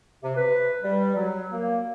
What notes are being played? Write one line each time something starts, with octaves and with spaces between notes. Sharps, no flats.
C3
B4
G3
F#3
A#3